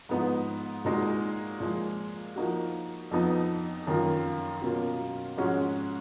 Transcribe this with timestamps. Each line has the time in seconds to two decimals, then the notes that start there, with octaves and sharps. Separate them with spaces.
0.09 G#2 F3 B3 D#4
0.85 A#2 G#3 D#4 F#4
1.60 A#2 F3 G#3
2.36 F3 A#3 D#4 F#4
3.11 F2 F3 B3 D#4
3.87 F#2 D#3 A#3 F4
4.62 B2 F#3 A#3 C#4 F4
5.37 G#2 F3 G#3 C#4 F#4